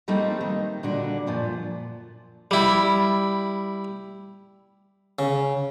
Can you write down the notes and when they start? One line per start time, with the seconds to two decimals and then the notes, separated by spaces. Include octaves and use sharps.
0.08 F3 G3 A3 A#3 C4 D#4
0.41 D#3
0.83 A#2 D3 G3 D4 F#4
1.27 F#2 A#2 F3
2.51 G3 E4
5.19 C#3